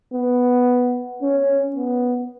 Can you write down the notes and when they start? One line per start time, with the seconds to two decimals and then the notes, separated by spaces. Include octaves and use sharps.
0.14 B3
1.22 C#4
1.76 B3